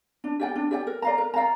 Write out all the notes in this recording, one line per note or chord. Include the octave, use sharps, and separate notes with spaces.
D4
G4 D5 G5
D4
G4 D5 G5
A#4
D5 F5 A#5
A#4
D5 F5 A#5